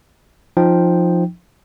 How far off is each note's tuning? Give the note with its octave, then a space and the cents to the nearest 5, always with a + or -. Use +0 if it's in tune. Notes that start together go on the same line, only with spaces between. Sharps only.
F3 +0 D#4 -5 G5 +0